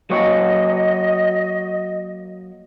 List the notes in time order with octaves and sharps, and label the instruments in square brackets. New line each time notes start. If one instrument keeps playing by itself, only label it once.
[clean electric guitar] F#3 A#3 C#5 [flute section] D#5